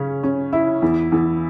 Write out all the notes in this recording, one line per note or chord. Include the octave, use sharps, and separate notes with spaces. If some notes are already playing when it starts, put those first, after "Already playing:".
Already playing: C#3 C#4
C#4
E4
E2
E2